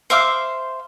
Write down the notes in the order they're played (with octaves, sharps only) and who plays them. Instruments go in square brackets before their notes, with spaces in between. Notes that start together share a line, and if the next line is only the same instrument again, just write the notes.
[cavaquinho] C5 E5 F5 D6